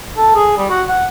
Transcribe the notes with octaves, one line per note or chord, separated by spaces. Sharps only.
A4
G#4
G3
F#4
F#5